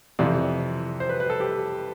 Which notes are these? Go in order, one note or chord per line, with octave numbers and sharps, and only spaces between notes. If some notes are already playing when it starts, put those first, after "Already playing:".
F2 C3 E3 D5
C5
B4
B4
A4
G4